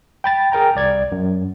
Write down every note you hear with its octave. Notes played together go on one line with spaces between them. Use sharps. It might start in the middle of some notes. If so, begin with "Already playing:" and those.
G5 B5 A6
G#4 A#4 G5 A#5
C2 D5 G#6
F#2